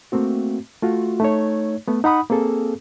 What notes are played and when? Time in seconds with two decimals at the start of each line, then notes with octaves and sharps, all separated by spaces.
0.12 A3 A#3 C4 F#4
0.83 A3 F4 F#4
1.20 A3 D#4 C#5
1.88 A3 B3
2.04 D#4 F#5 B5 D#6
2.30 A#3 C4 G#4 A4